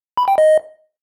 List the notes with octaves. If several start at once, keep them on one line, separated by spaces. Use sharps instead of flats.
B5
G5
D#5